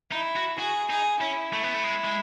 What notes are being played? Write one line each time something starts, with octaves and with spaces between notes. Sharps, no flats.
D#4 E4
F#4
F#4 G#4
D#4 G#4
C#4 E4
A3
B3
A3
G#3
G#3